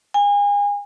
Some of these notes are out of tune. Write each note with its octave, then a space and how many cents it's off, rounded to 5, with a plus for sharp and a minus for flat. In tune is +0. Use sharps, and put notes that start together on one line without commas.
G#5 -35